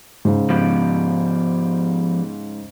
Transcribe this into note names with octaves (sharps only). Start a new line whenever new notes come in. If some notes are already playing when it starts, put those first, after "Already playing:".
G#2 C#3
F3 B3 G4